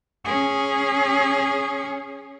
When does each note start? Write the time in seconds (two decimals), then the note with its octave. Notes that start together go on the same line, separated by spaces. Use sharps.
0.25 C#4 G#4